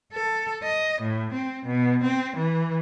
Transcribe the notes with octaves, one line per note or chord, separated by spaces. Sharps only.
A4
D#5
A2
C4
B2
C4
E3